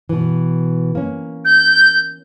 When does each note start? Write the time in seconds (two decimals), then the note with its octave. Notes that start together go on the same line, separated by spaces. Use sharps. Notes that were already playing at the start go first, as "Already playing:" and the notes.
0.09 B2 E3
0.95 A#3 C#4
1.45 G6